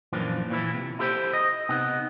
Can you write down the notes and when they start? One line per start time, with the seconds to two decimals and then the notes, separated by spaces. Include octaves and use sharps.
0.12 F#2 A#2 E3 F3 A#3 D4
0.50 A#2 E3 E4
0.74 C3
0.99 E4 G4 A4 C5
1.34 D#5
1.69 C3 B3 D#4